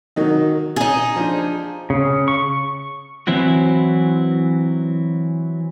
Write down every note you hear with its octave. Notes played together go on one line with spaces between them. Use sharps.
D#3 F#3 D#4
C#3 D#4 G#4
F3 D4
C#3
C#6
E3 F#3 C4 E4 F#4